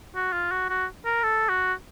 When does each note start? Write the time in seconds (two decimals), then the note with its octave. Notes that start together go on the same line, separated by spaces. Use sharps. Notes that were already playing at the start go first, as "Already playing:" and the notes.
0.15 F#4
0.33 F4
0.51 F#4
0.69 F#4
1.05 A#4
1.23 A4
1.49 F#4